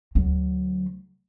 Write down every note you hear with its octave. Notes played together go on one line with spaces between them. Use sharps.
D2 F#3